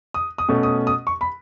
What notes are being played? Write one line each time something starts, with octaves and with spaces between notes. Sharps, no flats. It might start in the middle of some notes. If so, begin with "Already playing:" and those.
D#6
D#6
B2 A3 C#4
D#6
D#6
C#6
B5